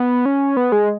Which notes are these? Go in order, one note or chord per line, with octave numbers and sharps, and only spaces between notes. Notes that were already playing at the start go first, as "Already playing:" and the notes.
Already playing: B3
C#4
B3
G#3